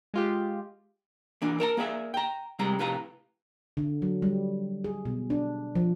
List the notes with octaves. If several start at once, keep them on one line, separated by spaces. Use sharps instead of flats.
G#3 F4 G4
E3 A#3 D4
A#4 A5 A#5
A#3 G#4 D5 E5
G5 A#5
C3 G3 G#3 A#5
F2 A2 C3 B4 F5 A#5
D3
F#3
G3
G#4
B2
D4
F3